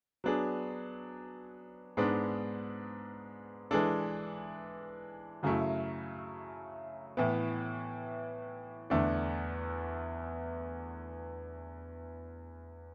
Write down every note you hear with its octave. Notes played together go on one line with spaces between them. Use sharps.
F#3 B3 D4 G#4
G#2 G#3 B3 D4
E3 G#3 D4 A4
F#2 C#3 F#3 A3 E4
A2 E3 B3
E2 D3 A3 D4